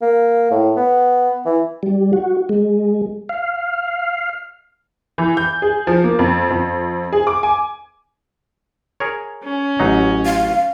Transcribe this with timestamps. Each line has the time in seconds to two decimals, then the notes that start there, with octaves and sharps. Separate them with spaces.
0.02 A#3
0.51 A2
0.77 B3
1.46 E3
1.83 G3
2.13 F#4
2.49 G#3
3.29 F5
5.18 E3
5.37 G6
5.62 G#4
5.87 F3
6.04 A#3
6.19 F2
6.50 F2
7.12 G#4
7.27 D6
7.43 G#5
9.00 G#4 A#4 C#5
9.43 C#4
9.79 A1 F#3 D#4
10.26 F5